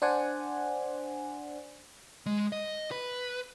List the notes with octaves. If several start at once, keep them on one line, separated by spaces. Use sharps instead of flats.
D4 C5 D5 F#5 G#5
G#3
D#5
B4